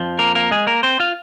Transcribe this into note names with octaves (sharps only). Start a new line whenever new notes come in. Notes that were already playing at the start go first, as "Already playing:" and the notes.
Already playing: F2 F3
A#3 A#4
A#3 A#4
G#3 G#4
A#3 A#4
C4 C5
F4 F5